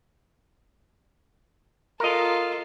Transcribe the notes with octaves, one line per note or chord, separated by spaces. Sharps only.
F4 A4 A#4 D#5